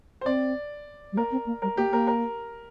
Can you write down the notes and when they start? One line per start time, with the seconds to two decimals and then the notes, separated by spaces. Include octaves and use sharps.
0.21 C5
0.26 C4 D5
1.12 G3
1.17 A#3 A#4
1.32 C4
1.46 A#3
1.62 G3 A#4
1.77 A#3 G4
1.92 A#3 A#4
2.07 A#4